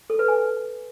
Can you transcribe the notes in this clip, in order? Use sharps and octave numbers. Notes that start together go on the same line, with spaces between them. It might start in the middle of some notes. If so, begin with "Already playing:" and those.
A4
B4
G#5